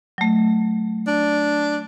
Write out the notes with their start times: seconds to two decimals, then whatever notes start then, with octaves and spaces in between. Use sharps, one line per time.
0.18 F#3 A3
1.07 D4